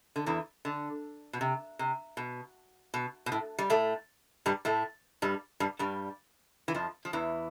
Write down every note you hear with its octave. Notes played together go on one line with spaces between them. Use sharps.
D3
E2 E3
D3
B2
C3
C3
B2
B2
B2
A2
G3
A2 A3
G2 G3
A2 A3
G2 G3
G2 G3
G2 G3
E3
F2 F3
F3
E2 E3